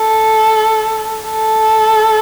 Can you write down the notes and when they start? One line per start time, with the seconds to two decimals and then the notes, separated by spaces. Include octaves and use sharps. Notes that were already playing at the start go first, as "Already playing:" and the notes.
Already playing: A4
1.25 A4